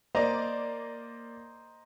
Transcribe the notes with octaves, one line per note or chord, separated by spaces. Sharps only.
A#3 C5 D5 D#5 A#5